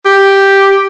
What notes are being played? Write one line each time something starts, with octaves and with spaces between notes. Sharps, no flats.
G4